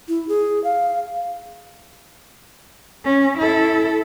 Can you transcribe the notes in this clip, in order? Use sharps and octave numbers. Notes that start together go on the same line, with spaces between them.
E4
G#4
F5
C#4
E4 A4